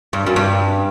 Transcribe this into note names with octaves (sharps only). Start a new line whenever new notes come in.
G2
F#2
G2